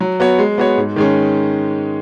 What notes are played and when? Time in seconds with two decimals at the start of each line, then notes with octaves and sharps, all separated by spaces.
0.01 F#3
0.20 B3 F#4 C#5
0.39 G#3
0.58 B3 F#4 C#5
0.77 G#2
0.96 D#3 G#3 C#4